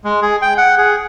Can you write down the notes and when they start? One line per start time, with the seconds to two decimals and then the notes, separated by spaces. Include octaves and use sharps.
0.04 G#3
0.22 G#4
0.42 G5
0.58 F#5
0.78 G#4